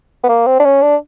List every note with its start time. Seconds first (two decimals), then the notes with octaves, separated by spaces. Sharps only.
0.24 B3
0.29 A#3
0.47 C4
0.59 D4
0.65 C#4
0.82 D4